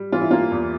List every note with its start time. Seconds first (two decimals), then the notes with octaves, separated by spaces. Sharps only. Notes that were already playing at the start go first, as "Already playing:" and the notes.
Already playing: G3
0.12 E3 F4
0.21 E4
0.31 A#3 F4
0.52 E2